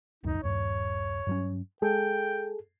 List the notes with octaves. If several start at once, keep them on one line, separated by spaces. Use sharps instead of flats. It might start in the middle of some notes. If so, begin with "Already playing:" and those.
D#1 C#2 F#2 D#4
D#1 G2 C#5
G2 F#3 C#4
G#3 G#4 A4 G5